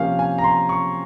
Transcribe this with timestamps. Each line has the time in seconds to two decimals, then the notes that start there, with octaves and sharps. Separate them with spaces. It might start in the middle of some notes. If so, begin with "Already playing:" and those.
Already playing: C3 F3 A#3 C#4 F5
0.19 G#5
0.38 A#5
0.44 C6
0.69 C#6